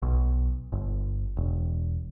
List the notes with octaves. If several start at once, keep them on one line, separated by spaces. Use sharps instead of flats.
B1
G1
E1